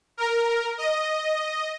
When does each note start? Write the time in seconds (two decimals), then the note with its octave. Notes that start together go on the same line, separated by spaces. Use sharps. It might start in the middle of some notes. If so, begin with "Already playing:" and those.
0.17 A#4
0.78 D#5